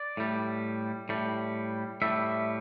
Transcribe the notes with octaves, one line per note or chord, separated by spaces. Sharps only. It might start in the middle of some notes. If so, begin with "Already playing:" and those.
Already playing: D5
A2 G3
A2 G3
A2 G3 E5